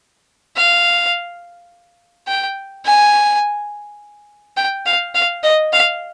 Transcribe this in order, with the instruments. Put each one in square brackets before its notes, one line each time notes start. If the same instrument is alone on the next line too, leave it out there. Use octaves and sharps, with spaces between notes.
[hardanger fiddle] F5
G5
G#5
G5
F5
F5
D#5
F5